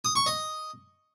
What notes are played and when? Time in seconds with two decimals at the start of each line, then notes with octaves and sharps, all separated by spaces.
0.05 D#6
0.15 C#6
0.26 D#5